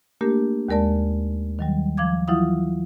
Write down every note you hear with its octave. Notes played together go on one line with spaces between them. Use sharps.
A3 A#3 D4 G4 A#4
D#2 G#3 A#4 D5 A5
D#3 F#3 G3
F3 F5 D6 G#6
E3 F#3 E4 F4 F5 D#6